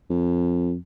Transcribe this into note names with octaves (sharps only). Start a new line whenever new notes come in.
F2